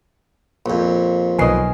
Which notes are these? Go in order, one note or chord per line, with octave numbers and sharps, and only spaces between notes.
A#1 F2
B1 D#3 B4 C#5 D#5 G#5 C7